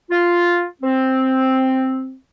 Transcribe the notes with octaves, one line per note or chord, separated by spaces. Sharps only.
F4
C4